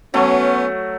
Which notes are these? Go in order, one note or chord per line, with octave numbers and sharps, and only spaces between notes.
F#3 A3 B3 C#4